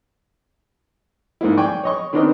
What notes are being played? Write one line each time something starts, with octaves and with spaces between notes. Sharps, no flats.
G#2 A#3 E4
D5 G5 G#5 C#6
C#5 D#5 C#6
D#3 B3 C4 D4 A#4 D#5